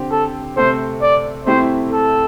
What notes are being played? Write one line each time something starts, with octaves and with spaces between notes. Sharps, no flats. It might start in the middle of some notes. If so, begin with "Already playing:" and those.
Already playing: D3 C4 G4
A4
C3 A3 C4 A4 C5
D5
C3 A3 C4 E4 G4 C5
A4